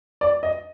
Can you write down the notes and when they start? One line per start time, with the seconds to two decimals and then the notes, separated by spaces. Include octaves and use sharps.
0.21 D5
0.43 D#5